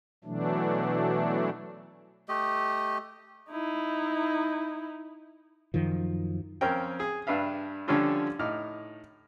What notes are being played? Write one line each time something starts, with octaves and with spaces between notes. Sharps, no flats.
B2 E3 F#3 A3 D4
A3 G4 D#5
D#4 E4
F#2 D#3 F3
F2 C4 C#4 A#4 G5
G#4
G2 D4 B4 E5 F5
D3 F3 G3 C#4 D4 F4
A2 D#4 D6 F6